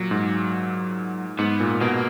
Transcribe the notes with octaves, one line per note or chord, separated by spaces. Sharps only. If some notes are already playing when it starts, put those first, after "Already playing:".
Already playing: A#2 F#3
G#2
G#2 B3
A#2
B2 A#3